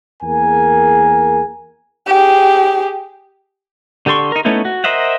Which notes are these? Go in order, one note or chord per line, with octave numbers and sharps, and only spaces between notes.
E2 A#3 G#4 A#4 G#5
G4 G#4
D3 G4 A4 C6 C#6
D#4 A#4
A3 B3 C#4 D#4 E4
F#4
A#4 C5 D#5 E5 F#5